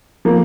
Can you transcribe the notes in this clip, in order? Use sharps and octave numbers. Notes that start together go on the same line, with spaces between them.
F3 A#3